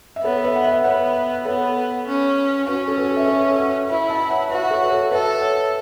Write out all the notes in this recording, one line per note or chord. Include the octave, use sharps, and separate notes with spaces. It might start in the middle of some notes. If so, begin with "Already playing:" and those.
E5
B3 A4 C#5
B4 E5
F#5
B4 E5
B3 C#5 F#5
B3 A4 C#5
C#4
C#4 F#4 B4
A4
F#4 B4
E5
A4 C#5
C#5 F#5
E4 B4 E5
E5 A5
C#5 F#5
F#4 B4 E5
A4 C#5
B4
A4 C#5
A4 B4 E5
C#5 F#5